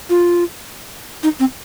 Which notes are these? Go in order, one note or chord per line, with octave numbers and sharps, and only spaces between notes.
F4
D#4
C4